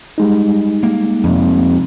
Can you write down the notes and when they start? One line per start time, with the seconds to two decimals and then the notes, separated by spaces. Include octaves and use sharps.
0.18 G3 G#3 D#4
0.83 A#3
1.24 F2 C3